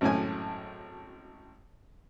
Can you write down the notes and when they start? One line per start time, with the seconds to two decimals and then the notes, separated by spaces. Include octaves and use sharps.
0.01 G#1 F#2 A2 G#5